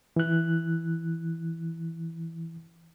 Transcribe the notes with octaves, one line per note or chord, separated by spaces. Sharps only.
E3 F#6